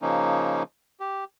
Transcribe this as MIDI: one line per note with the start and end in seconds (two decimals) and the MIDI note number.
0.02 0.63 49
0.02 0.63 53
0.02 0.63 58
0.02 0.63 61
0.02 0.63 63
1.00 1.24 67